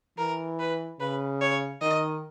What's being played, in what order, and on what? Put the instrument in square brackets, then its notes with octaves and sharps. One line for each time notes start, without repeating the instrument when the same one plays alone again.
[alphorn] E3 [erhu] A#4
[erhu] B4
[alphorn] C#3 [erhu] B4
[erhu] C#5
[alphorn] D#3 [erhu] D#5